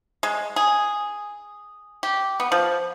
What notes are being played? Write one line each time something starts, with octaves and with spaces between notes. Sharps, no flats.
G#3
G#4
G4
B3
F3